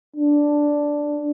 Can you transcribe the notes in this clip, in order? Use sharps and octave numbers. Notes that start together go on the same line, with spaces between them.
D4